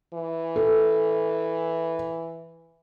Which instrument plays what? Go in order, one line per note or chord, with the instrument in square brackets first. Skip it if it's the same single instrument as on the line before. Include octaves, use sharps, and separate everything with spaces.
[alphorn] E3
[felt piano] A4